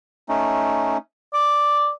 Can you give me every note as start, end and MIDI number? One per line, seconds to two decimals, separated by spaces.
0.29 0.97 57
0.29 0.97 61
0.29 0.97 63
1.34 1.90 74
1.34 1.78 86